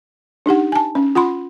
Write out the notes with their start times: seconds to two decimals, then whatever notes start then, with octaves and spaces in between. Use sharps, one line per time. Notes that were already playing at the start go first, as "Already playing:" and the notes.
0.46 D4 D#4 G4 F#5
0.72 G#5 A5
0.95 C#4
1.15 F4 F#5 B5 C6